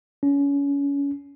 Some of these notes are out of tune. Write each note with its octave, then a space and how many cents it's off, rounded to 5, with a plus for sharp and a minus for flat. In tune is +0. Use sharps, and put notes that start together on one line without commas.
C#4 +30